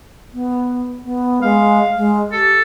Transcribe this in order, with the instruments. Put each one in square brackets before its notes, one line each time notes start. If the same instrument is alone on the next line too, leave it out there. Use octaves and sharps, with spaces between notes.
[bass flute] B3
B3
[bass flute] G#3 [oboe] F5
[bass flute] G#3
[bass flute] G4 [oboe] A4